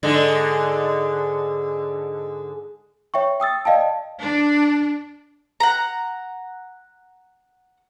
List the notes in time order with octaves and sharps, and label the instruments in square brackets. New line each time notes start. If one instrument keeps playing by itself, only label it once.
[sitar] G#2 D3 G#3
[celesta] C#5 E5 G5 C#6
G5 D#6 E6 A6
D5 D#5 F5 G5 A5
[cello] D4
[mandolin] F#5 A#5